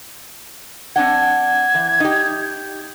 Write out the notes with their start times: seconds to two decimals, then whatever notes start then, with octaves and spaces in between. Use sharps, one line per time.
0.96 C4 D4 F#5 G#6
1.74 E3
2.00 D#4 G4